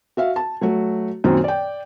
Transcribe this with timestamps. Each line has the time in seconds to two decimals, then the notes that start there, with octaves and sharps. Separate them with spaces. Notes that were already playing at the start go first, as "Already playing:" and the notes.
0.17 F#4 E5 F5
0.36 A5
0.61 F#3 A3 F#4
1.24 F#2 A#2 D#3 F#3 C4
1.44 D5 G5